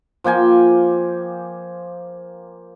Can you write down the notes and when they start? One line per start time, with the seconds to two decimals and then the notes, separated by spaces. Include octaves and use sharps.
0.24 F3 A#3 G5 G#5